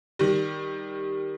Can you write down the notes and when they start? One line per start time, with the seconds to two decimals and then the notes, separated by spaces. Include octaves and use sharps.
0.19 D#3 G3